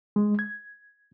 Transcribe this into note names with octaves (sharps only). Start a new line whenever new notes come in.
G#3
G#6